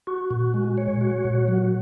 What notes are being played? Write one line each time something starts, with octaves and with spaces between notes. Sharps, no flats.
F#4
A#2
G#3
C#5
F#4
A#2
F#3